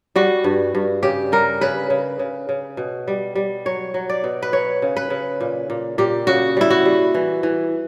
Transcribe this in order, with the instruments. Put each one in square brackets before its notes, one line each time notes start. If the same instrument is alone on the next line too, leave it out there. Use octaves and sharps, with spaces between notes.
[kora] G3 F#4
G2
G2
C#3 G4
G3 A#4
C#3 B4
C#3
C#3
C#3
B2
G3
G3
F#3 C#5
F#3
D5
B2
B4
F#3 C#5
C#3
B4
C#3
A#2
A#2
A#2 G4
C#3 F#4
G3 E4
F#4
G3
E3
E3